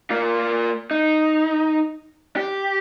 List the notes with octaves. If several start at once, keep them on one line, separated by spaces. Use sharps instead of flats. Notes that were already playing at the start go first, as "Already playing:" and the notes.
A#3 F4
D#4
G4